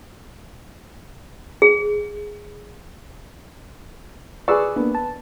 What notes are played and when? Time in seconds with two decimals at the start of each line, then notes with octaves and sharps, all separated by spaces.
1.62 G#4
4.48 G#4 B4 D5 C#6 E6
4.76 A#3 B3 D4
4.95 A5